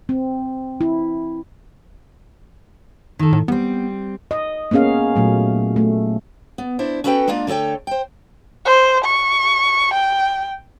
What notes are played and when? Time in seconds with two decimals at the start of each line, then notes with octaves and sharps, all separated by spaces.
0.09 C4
0.81 E4
3.19 D#3 A4
3.33 A2
3.48 G3 B3 C4
4.31 D#5
4.71 A#3 B3 C#4 G#4 F5
5.16 A#2 F#3 A3
5.76 A3
6.58 B3
6.79 D4 E4 C5
7.04 C#4 F#4 A4 B4 D#5 G5
7.28 G#3 A#3 D4 F4
7.47 D3 A3 A4 C#5 G5
7.87 C5 G5
8.65 C5
9.05 C#6
9.94 G5